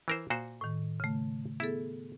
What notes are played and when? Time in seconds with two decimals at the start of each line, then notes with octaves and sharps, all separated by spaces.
0.08 E3 A#4 C5
0.30 A#2 F#4 C5
0.61 A2 D#3
1.00 C#3 A3
1.60 B3 E4 G#4 A4